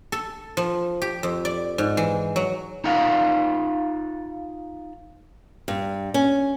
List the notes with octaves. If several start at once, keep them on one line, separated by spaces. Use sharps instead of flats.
A4
F3
G4
F2
D5
G#2
E3
F#3
D#4 F4 A4 F5 F#5
G2
C#4